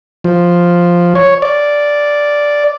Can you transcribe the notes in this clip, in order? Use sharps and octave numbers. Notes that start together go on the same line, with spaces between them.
F3
C#5
D5